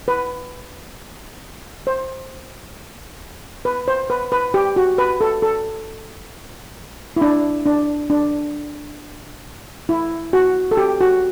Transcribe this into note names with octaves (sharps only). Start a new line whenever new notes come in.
B4
C5
B4
C5
B4
B4
G4
F#4
B4
A4
A4
E4
D4
D4
D4
E4
F#4
A4
G4
F#4